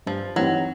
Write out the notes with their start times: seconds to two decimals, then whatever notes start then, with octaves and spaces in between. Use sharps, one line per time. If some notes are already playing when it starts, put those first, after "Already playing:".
0.06 G2 F3
0.36 E3 F#3 G3 C4 D#4